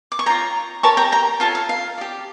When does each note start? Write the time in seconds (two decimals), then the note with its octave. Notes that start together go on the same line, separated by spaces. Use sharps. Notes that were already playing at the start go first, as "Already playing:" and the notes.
0.12 D6
0.19 C#6
0.26 F4 C#5 G5 A#5
0.83 G4 A#4 C#5 A5 C#6
0.97 G5 A#5
1.12 G5 A#5
1.40 F4 A4 C#5 F5 A5
1.55 F5
1.69 F5
1.98 G4 D5